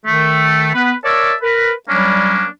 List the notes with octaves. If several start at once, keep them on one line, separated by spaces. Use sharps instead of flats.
D#3 A3
B3 B4
A#4 C#5 D5 E5 A5
A#4 B4
F#3 G3 A#3 C#4 D4